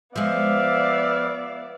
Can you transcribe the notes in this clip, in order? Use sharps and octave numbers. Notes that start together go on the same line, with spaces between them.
F3 G#3 B3 D5 E5 F5